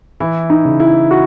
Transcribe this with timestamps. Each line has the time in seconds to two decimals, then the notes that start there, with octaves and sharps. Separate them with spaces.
0.20 E3 E4
0.50 D#4
0.65 C#3
0.80 E4
1.11 F#4